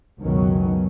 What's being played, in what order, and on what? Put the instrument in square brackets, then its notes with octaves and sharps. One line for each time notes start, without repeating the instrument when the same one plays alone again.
[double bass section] F#1 C#2 B2 D#3 F#3 C#4